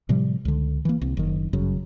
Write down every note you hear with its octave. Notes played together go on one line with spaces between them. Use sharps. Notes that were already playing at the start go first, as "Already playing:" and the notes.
A2 C3 F3 G3
C#2 D3
E3 A#3
C2
F#1 D#3
G1 F#2 C#3